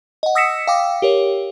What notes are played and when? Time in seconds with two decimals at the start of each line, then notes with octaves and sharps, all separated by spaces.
0.23 D#5 F#5
0.35 D#6 E6 A#6 B6 C#7 E7
0.67 F5 G5 D6
1.02 G4 A#4 C#5